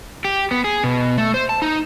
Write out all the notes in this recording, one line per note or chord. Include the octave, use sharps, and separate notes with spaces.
G4
B3
G#4
B2
A3
C5
A5
D#4